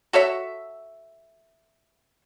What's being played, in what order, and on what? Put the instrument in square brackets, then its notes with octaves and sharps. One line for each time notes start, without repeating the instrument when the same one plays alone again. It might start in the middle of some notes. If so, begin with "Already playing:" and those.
[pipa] F#4 A4 C#5 E5